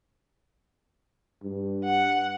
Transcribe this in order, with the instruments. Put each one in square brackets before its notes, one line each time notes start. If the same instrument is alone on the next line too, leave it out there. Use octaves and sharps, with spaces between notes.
[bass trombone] G2
[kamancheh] F#5